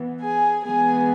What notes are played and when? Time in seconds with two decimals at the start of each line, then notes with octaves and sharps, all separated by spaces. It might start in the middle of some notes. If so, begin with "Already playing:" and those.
Already playing: E3 B3
0.20 G#4 G#5
0.63 E3 G#3 B3 G#4 G#5